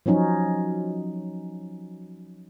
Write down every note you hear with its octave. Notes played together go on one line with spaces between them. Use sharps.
F3 F#3 C#4 D#4